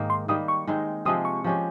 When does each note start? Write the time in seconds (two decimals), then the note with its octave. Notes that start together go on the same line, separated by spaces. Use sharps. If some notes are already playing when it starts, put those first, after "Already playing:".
Already playing: G#2 D#3 A#3
0.10 C6
0.28 D#3 G3 A#3 D#6
0.48 C#6
0.67 D#3 G#3 C4 D#4
1.05 C3 F3 G#3 C4 D#6
1.25 C#6
1.44 F3 G#3 C#4 G4